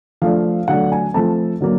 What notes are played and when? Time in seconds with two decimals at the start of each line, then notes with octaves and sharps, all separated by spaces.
0.22 F3 A3 D4 F5
0.68 D3 F#3 A3 D4 F#5
0.92 G#5
1.14 F3 A3 C4 A5
1.60 D3 F#3 A#3